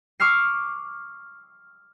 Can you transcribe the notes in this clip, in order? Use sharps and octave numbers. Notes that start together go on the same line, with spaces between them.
C#6 D6 E6 F6 C7